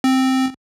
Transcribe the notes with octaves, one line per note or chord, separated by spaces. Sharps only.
C4